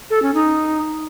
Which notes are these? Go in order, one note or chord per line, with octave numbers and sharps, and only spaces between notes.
A4
C#4
D#4